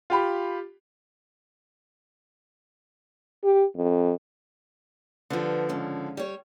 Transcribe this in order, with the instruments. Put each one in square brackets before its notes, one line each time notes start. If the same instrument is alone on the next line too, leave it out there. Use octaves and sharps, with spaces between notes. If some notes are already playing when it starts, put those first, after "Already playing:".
[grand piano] F4 G4 B5
[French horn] G4
F2
[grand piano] D3 F3 [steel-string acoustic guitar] G3 B3
[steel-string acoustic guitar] G#2 C#3 C#4
G3 C#5